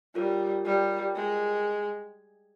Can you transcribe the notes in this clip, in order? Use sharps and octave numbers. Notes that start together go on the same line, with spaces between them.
G3 F4 A#4 C#5
G3 F4 A#4 C#5
G#3 F4 A#4 C#5